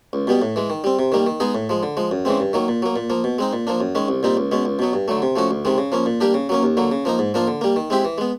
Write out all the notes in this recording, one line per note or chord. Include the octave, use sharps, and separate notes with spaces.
C#2
B2 G3 B3
A2
E3 G#3
D#3
G3 C4
C3
D#3 G3 A#3
D#3
G#3 B3 D#4 G#4
A2
F3 G#3
D3
F3 G#3
F#2
C#3 E3 G#3 C4
G2
D#3 F#3 A#3
A#2
F#3 A#3
A#2
F3 A#3
B2
G#3 C4 D#4
A#2
F3 A#3 D4
F#2
D#3 G#3 C#4
C2
A#2 G3 C4 D#4
C#2
B2 G#3 C#4
C#2
B2 F#3 B3
G2
D3 F#3 A3
C3
F3 A3 C#4 F#4
D2
C3 D#3 G#3
C#3
F3 A#3 C#4
A#2
G3 A#3 D4 G4
C#3
F#3 A#3 C#4
D#2
D3 F#3 A#3
C#3
F3 A#3 D#4
G#2
F3 A#3 D4 F4
D3
G3 A#3
D#3
G#3 C4 E4 G4
E3
G#3 B3